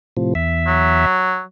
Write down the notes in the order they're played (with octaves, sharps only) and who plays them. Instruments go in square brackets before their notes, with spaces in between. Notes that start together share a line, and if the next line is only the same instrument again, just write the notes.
[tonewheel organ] A2 C3 F3
E2 E5
[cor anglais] F#3